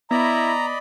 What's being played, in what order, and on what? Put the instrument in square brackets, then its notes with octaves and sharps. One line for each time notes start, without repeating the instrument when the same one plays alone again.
[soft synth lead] B3 [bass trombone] E4 [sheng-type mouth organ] D5 D#5 B5 [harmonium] A#5